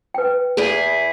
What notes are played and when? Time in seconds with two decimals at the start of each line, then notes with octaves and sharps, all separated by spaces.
0.14 B4 G5
0.57 E2 E4 G#4